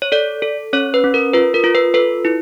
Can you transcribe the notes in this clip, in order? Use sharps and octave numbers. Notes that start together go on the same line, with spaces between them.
C#5
A4 D5
A4
C#4 C#5
B4
C#4
A#4
F4 B4
A#4
F4
B4
A4 B4
E4